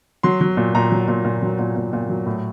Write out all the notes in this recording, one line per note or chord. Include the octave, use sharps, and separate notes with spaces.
F#3 C6
F#3
A#2
A#2 A#5
F#3
A#2
A#2
F#3
A#2
A#2
A#2
F#3
A2